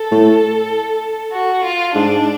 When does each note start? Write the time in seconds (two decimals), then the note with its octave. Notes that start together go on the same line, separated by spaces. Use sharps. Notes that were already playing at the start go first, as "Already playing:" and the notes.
Already playing: A4
0.11 A2
1.34 F#4
1.65 F4
1.94 G#2 D4